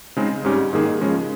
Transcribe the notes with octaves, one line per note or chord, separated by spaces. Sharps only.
C#3 G#3 C4 D#4
G#2 G3 C#4 G4
G#2 D#3 A#3 D#4 G#4
C#3 F3 G#3 C#4